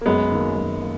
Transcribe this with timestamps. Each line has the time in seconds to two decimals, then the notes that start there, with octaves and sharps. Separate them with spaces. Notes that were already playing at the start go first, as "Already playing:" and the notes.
0.01 A#3
0.06 F#2 G#3 B3
0.31 D#3 A#3
0.56 F#2
0.82 A#3